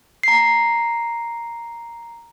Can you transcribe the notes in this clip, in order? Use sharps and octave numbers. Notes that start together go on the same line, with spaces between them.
A#5 C7